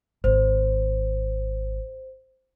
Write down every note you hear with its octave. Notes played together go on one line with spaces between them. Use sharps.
G#1 D#3 C5